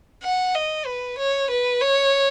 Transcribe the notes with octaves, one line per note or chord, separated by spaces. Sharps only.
F#5
D#5
B4
C#5
B4
C#5